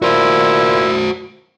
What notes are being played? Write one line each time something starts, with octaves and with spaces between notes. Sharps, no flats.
A#2 E4 F#4 C5